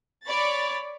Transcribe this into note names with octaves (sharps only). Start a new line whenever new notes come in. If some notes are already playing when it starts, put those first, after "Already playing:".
C#5 D5 B5 A6